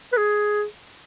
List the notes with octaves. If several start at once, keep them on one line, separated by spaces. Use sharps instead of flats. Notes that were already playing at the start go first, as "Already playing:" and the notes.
B4
G#4